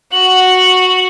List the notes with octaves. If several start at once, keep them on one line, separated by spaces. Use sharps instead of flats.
F#4 F#7